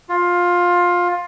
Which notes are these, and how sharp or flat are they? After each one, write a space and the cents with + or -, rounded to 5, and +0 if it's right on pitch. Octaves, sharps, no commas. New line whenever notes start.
F4 +15